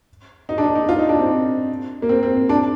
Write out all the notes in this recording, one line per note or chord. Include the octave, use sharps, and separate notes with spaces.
D#4
D4
D#4
D#4
F4
D#4
D4
C4
A#3
C4
C4
D4